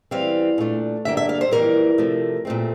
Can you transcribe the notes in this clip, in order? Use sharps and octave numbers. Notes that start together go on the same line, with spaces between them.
E2 E3 G3 C4 F5
A#2 A3 D4
G2 D3 G3 A#3 D4 E5
E5
F5
C5
F2 E3 G3 A#3 A#4
C3 F3 A3
A#2 A3 C4